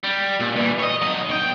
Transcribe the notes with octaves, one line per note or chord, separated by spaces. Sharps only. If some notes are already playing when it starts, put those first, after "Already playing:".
G3
A#2
G2 E3
C#5 D#5
F#3 D#5
B1 G5